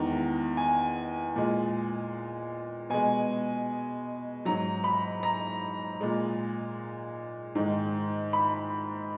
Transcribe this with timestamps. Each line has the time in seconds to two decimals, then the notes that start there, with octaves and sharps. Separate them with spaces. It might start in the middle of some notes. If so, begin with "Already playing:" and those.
Already playing: E2 D#3 G#3 A#5
0.57 G#5
1.36 A#2 G#3
2.90 B2 G#3 G#5
4.45 G#2 F#3 A#5
4.84 B5
5.23 A#5
6.01 A#2 G#3
7.55 G#2 D#3 G#3
8.33 B5